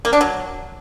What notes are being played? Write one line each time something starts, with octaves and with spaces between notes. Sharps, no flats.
A#3
D4
F#3